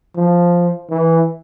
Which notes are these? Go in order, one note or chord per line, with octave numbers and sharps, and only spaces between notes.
F3
E3